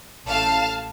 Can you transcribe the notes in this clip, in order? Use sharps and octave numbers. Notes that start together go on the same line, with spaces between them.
A1 A2 A3 F5 A5